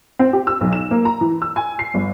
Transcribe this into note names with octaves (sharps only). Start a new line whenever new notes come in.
C4
G4
E6
B1
E7
A#3
A#5
E3
E6
G#5
C7
G1